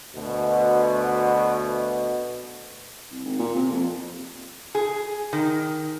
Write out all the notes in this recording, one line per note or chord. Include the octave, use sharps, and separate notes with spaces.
D2 B2
C2
G#1
A#2
C3
F2
G#4
D#3